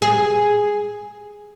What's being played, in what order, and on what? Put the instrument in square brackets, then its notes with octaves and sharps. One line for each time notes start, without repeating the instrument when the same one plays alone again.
[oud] G#4